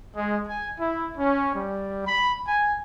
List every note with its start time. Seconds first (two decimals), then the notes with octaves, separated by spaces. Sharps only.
0.16 G#3
0.47 G#5
0.79 E4
1.17 C#4
1.54 G3
2.07 B5
2.46 G#5